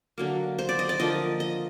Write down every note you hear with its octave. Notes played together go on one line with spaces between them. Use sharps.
D3 F#3 A#3
C5
D5
D#5
D5
D3 F3 A#3 D#5
D#5